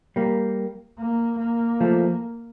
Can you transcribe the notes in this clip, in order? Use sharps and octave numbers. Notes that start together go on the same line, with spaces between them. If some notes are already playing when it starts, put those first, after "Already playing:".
G3 A#3
A#3
A#3
F3 A3